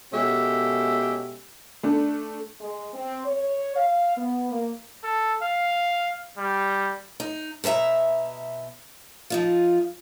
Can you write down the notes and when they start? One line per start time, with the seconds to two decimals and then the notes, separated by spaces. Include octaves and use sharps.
0.12 B2 G#3 C#4 G4 A4 E5
1.83 A3 D4
2.61 G#3
2.94 C4
3.26 C#5
3.76 F5
4.17 B3
4.51 A#3
5.04 A4
5.43 F5
6.38 G3
7.20 D#4
7.64 B2 A4 B4 E5 A#5
9.30 F3 D#4 F4